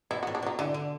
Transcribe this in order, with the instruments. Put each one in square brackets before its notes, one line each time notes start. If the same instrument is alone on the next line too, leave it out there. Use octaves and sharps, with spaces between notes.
[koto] B2 [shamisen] E4
[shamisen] F#4
[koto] A2
[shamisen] D4
[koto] B2 [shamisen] F#3
[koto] D3 [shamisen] E3
[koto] D3